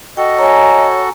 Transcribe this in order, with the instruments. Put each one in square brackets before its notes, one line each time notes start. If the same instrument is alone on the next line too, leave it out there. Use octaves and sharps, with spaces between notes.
[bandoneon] F#4 A4 [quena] D#5 [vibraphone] G5
[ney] C#5 [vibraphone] G#5 A#5